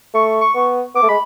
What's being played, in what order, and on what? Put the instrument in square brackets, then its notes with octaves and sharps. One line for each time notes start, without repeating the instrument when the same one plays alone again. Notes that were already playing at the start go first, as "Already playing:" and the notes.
[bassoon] A3 [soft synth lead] C#6
[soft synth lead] C#6
[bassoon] B3
[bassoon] B3 [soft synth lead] D6
[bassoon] A3
[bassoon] G#3 [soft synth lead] B5